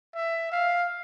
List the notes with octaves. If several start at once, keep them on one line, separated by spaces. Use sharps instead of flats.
E5
F5